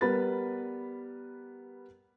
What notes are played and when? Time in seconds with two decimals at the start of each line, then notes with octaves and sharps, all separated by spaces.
0.01 G3 B3 A#4 B4 B5 A6